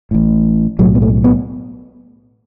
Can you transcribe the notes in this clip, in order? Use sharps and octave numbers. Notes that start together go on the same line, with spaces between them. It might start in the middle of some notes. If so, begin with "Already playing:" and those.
A1 A2
B1 A2 F#3
B3
A3
B3